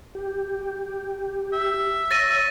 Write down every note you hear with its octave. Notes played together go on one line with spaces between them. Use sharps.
G4
E5
C#5 A6 A#6 D#7